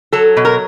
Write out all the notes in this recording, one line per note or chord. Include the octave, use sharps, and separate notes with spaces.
F#3 A4
B2
A#4